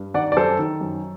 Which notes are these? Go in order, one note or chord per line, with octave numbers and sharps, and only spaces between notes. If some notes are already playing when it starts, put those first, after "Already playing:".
Already playing: G2
D#3 D5 F#5
D5
F#2 A4 C5
D#3
F#2